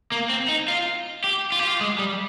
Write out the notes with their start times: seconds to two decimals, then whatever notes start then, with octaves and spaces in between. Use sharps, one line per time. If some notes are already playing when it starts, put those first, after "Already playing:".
0.12 A#3
0.30 C4
0.48 D#4
0.68 F4
1.24 G4
1.52 F4
1.59 G4
1.67 F4
1.81 G#3
1.99 G3